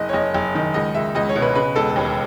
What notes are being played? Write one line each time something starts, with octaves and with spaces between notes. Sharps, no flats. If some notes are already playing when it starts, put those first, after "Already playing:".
Already playing: F#1 D#5
C#5
F#1 D#5
F#1
D#3
C#2 D#5
C#2 E5
C#2 D#5
C#5
B2
B4
C#3 B4
E1 A4
D#2